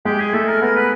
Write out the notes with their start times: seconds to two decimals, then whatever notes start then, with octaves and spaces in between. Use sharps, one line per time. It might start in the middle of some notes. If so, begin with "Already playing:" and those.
0.05 G#3 G4
0.20 G#4
0.33 A3 A4
0.48 A#4
0.62 B3 A#4
0.76 B4